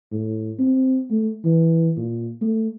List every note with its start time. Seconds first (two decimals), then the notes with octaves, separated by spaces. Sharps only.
0.12 A2
0.59 C4
1.11 A3
1.45 E3
1.97 A#2
2.42 A3